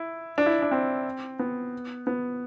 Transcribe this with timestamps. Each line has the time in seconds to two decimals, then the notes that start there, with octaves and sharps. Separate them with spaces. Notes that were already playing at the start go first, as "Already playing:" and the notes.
Already playing: E4
0.38 D4
0.46 E4
0.62 D4
0.71 C4
1.39 B3
2.07 B3